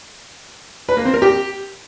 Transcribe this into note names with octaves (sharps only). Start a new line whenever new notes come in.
B4
A#3
C4
A#4
G4